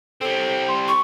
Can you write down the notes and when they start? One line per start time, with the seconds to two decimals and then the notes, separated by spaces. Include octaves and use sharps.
0.21 G3 C4 A4 C5
0.69 C6
0.88 C#6